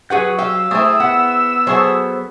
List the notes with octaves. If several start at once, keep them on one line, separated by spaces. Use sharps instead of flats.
F#3 G#4 B4 F#5 C#6 G6
G4 F5 E6
A3 C4 E4 G#4 D#6
B3 F#5
F#3 F#4 G#4 A4 C5